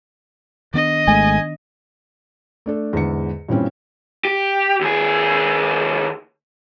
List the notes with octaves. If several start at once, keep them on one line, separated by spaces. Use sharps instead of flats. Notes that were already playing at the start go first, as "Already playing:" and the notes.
D#3 B3 D4 D#5
G#1 G#3 A3 G#5
A3 D4 A4
E2 G#2 D3 C#7
G2 A#2 E3 C4 C#4
G4
D#2 G#4